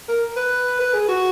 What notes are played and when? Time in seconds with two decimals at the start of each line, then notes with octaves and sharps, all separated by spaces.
0.09 A#4
0.37 B4
0.80 B4
0.94 G#4
1.09 F#4